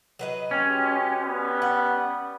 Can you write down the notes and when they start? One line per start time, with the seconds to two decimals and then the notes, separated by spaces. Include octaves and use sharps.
0.19 F#3 B4 D#5
0.51 G#3 C#4 G4
1.23 G3 B3
1.62 F#5